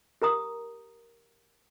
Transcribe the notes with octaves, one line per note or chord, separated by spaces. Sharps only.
G4 A#4 A#5 D#6